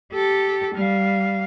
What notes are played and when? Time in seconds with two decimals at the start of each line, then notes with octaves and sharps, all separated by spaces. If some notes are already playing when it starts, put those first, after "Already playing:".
0.13 G4 A4
0.75 G3 F5